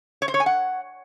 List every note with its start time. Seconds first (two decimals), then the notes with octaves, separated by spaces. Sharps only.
0.22 C#5
0.28 C5
0.34 C#5
0.40 G#5
0.46 F#5